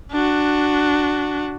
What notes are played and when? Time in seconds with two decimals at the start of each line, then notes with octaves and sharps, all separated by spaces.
0.12 D4 F#4